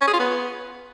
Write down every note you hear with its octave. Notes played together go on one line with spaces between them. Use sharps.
C#4
G#4
F4
B3